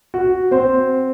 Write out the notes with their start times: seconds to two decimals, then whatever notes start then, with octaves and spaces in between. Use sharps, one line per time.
0.14 F#4
0.51 C4 C5